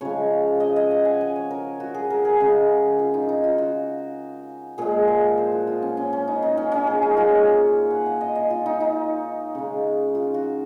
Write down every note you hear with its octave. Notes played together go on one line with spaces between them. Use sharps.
C#3 F3 G#3 C#5
D#5
D#5
F#5
G#5
G#5
C#5
A#4
F#4
G#4
A#4
G#4
C#3 G#3
F4
D#4
D#4
F4
F#4
A#2 F3 G#3 G#4
A#4
C5
F#4
F4
C#4
C#4
C#4
D#4
D#4
C#4
C#4
G#4
D#4
A#2 G#3 F4
F#5
F5
D#5
D#5
F4
D#4
D#4
C#3 G#3
F4
F#4